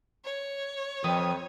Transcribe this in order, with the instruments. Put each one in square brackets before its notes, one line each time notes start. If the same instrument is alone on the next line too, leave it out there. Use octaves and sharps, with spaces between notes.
[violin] C#5
[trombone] F2 [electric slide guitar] F3 B4 G5 [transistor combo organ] D#6